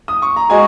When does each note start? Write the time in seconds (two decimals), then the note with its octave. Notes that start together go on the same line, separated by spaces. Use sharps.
0.08 D#6
0.22 C#6
0.36 A#5
0.50 G#3 F#4 D#5 G#5